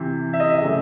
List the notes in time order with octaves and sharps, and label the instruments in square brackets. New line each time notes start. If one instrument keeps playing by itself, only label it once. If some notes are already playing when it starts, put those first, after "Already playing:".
Already playing: [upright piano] C3 E3
E5
D#5
E5
C#3 F#3 A3